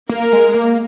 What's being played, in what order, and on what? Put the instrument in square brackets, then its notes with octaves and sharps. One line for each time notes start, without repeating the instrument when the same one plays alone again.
[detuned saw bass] A#3 [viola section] A#4
[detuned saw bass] G#3
A#3